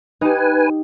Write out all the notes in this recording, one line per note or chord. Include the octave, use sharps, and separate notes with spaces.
D#4 G4 B4 G#5